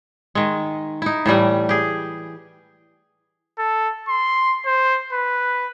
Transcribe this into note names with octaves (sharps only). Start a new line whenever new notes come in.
D#3 G#3
D#4 E4
A2 E3 G3 A3
G4 G#4
A4
C6
C5
B4